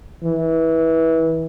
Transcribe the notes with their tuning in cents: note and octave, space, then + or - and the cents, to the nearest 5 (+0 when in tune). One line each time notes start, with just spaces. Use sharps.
E3 -20